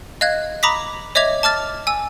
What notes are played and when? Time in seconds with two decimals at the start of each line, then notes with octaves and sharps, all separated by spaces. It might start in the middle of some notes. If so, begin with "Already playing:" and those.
0.21 D#5 F5 F#6 G#6
0.63 A#5 B5 D6 D#6 A#6 B6
1.15 C#5 D#5 E5 D6 G#6 F7
1.43 A5 D6 F6 A6
1.87 G#5 E6